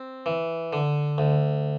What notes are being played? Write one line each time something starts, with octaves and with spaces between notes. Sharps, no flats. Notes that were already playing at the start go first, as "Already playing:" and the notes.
Already playing: C4
E3
D3
D2